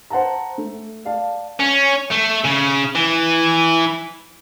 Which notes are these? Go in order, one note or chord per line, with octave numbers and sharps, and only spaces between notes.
C5 F#5 A5 A#5
A3
D5 F5 A5
C#4
A3
C#3
E3